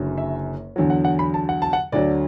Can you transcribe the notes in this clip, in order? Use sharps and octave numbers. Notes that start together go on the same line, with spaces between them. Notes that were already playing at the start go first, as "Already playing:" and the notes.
Already playing: F#1 F#2 D3 F#3
E5
E2 D3 F#3
F#5
F#5
B5
A5
F#5
A5
F#5
D2 D3 F#3 D5